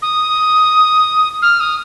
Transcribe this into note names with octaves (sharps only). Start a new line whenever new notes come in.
D#6
F6
D#6